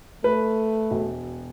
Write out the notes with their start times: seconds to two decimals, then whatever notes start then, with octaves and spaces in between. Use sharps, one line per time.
0.24 A3 B4
0.91 E1